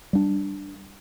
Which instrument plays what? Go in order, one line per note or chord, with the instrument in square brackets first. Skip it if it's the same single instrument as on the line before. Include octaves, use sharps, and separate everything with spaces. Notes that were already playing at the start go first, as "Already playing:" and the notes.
[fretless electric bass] G3 D4